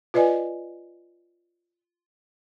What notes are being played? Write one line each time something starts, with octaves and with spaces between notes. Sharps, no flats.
F4 B4 D5 D#5 G#5